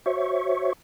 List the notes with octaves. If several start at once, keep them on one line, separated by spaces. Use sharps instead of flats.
F#4 C5 C#5 E5 C#6